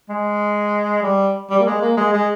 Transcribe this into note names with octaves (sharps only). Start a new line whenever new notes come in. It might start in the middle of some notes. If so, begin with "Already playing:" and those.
G#3
G3
G3
A#3
G#3
A#3
G#3
G#3